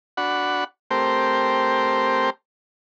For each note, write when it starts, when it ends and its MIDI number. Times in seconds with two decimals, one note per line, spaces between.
0.17 0.64 62
0.17 0.64 66
0.17 0.64 78
0.17 0.64 83
0.91 2.30 57
0.91 2.30 60
0.91 2.30 67
0.91 2.30 70
0.91 2.30 72